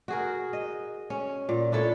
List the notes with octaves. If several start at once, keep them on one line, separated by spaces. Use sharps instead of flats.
F#4 G#4 A#4
D#5
C#4
A#2
D4 E4 A4 C#5